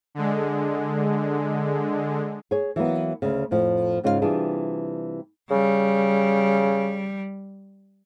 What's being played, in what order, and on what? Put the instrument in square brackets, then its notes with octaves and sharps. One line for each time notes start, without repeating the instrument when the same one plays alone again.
[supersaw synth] D3 G#3
[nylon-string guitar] G#4 C#5
E3 F#3 A#3 B3
D2 C#3
F2 A2 F3
G#2 C#3 C#4 F4 C#5 F5
C3 E3 G3 D4 F4 G#4
[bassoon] C#3 [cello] G3